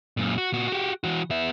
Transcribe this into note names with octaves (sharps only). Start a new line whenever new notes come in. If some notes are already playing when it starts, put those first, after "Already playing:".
F#2 A#2
F#4
A#2 F#4
F#4 G4
E3 F#4
B3 E5